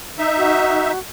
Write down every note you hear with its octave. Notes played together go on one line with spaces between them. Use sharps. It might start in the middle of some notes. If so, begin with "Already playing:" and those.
D#4 E5
F#4